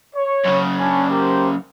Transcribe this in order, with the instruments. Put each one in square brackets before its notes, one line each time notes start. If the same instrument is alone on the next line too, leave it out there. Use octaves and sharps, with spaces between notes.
[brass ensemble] C#5
[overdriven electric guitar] F#2 C#3
[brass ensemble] C#4 D4
G4 A#4 C5